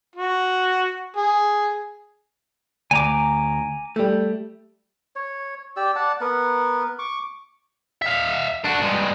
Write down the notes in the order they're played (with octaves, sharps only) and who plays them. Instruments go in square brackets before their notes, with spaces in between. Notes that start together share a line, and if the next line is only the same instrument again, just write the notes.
[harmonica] F#4
G#4
[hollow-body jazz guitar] D2 [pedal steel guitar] G#5 A#5 D6
[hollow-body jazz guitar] G3 A3
[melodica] C#5
G4 D5 E6
D5 F#5 A5
B3 A#4 B4 F#5
C#6 D6
[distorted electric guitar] E5 F5
D4 F#4
G2 G#3